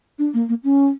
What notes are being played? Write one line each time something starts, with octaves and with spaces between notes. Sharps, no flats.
D4
A#3
A#3
C#4